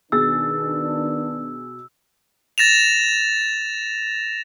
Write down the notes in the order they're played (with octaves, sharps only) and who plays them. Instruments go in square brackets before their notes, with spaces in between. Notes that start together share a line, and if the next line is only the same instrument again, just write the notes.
[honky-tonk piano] B2 G#4 A6 [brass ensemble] D#3 B3 D4 [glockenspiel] E6
[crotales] A6 A#6 E7 F7